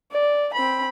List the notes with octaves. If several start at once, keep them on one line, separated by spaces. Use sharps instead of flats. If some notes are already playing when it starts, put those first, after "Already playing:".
D5
C4 B5